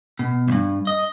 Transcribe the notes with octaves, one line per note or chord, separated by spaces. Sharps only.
B2
B1 G2
D#5